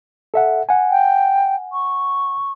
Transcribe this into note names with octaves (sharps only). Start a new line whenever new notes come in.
A4 E5 F#5
F#5 G#5
G5
C#6